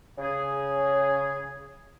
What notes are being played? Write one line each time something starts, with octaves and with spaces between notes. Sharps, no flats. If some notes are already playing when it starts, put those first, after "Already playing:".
C#3 G#4